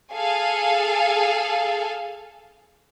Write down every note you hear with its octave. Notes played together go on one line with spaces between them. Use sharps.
G#4 A4 F5 G#5